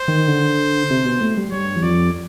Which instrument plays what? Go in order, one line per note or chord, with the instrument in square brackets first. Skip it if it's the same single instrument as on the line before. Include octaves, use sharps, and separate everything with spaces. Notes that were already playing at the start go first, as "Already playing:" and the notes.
Already playing: [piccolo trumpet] C5
[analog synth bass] D#3
D3
C3
B2
A2
G2
[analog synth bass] G2 [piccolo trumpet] C#5
[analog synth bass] E2
[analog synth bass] F2 [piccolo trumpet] D5